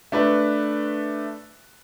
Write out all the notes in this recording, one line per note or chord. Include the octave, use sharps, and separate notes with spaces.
A3 D4 B4